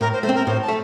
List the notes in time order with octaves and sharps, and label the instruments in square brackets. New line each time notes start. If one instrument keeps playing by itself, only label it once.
[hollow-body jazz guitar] A2 [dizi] A#4
[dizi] C5
[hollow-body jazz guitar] A3 [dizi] C5
[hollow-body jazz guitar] C4
[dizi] A#4
[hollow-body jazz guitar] A2 [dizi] C5
[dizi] A5
[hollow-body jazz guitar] A3